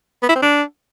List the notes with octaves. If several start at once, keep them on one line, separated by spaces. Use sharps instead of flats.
B3
E4
C4
D4